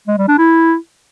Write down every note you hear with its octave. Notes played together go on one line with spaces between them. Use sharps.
G#3
G3
D4
E4